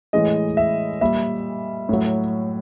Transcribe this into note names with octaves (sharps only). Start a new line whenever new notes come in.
A2 E3 G#3 D#5
E5
A#2 G3 E5
A2 F#3